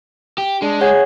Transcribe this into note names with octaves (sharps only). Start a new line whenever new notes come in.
G4
G#3 D4
G#4 C#5 F#5